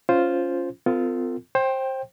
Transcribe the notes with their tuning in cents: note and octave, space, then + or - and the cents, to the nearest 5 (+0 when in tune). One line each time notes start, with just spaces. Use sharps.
C#4 +10 F4 +0 C5 +0
C4 -40 F4 +0 A4 +40
C5 +20 G5 +0